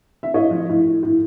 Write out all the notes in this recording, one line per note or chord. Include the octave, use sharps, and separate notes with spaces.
E5
A2 C#5 D#5
F3
A2
A2
A2